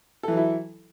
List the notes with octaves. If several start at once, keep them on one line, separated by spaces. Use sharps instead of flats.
E3 F#3 E4 A4